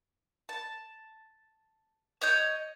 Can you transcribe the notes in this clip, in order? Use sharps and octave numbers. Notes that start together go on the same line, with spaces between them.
A5
C#5 D#5 G6